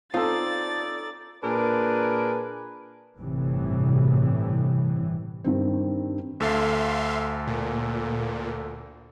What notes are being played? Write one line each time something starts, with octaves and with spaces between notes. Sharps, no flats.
C4 D#4 F4 A4 D5 A6
A#2 D4 G#4 A#4 B4 G#5
G1 A2 C3 E3
G2 D#3 C4
D2 A4 E5 F5 C6
A#2